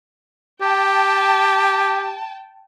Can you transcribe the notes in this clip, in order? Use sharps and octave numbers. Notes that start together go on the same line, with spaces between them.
G4 G5 A5